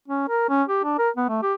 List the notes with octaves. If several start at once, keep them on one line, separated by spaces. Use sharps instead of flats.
C#4
A#4
C#4
G4
D4
A#4
B3
A3
G4